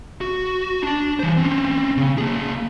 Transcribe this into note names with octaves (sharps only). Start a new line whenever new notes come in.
F#4
D4 A5
E3 C5
C4 C#4
C#3
A#3 G#4